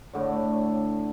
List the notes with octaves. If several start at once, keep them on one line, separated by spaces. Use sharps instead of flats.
A2 D3 D5